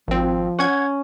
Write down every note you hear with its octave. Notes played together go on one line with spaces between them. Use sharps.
G#1 F3 C4
C#4 F#5 G#6